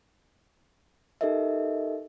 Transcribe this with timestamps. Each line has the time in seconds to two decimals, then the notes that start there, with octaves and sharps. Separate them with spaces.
1.21 D#4 G4 A4 A#4 D#5 E5